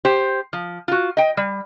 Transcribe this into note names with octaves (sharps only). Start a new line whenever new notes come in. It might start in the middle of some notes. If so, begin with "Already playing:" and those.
G4 C5
F3
F4 F#4
D#5 G5
G3